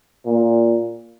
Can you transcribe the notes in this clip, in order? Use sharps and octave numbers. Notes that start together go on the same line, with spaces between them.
A#2